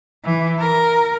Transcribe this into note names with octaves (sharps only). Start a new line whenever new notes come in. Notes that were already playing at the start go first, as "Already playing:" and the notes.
E3
A#4